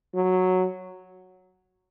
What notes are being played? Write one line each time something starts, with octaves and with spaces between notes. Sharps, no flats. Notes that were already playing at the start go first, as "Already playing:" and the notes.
F#3